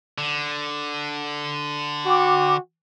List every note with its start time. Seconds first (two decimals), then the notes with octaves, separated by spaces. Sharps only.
0.18 D3
2.06 F#4 G5 D6